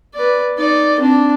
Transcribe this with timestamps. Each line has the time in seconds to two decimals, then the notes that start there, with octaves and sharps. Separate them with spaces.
0.14 B4 D5
0.58 D#4 D5
1.00 C4 D4